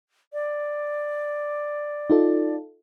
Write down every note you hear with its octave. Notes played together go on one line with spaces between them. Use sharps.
D5
D#4 F4 A4